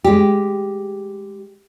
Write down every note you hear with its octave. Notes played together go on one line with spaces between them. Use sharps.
G#3 G4